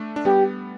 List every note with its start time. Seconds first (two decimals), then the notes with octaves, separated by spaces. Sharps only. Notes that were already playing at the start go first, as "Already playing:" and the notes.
Already playing: A3 D4
0.16 D4
0.25 G3 B3 G4